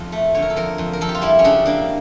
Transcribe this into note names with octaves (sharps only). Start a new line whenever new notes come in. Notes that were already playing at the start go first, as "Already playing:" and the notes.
Already playing: F2
A3
D3 C#5
A#4
A4
F2 A#4
F2
A#4
F2 A4
G4
F4
G3 E4
C#4
C#3 D4
A#3 D4